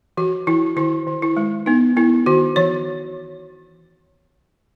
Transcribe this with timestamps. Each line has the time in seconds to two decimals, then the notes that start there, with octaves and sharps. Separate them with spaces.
0.17 E3 F#4
0.47 E3 E4
0.77 D#3 E4
1.07 D#3
1.22 E4
1.37 G#3
1.66 B3 D#4
1.96 B3 E4
2.26 D#3 F#4
2.56 E3 C#5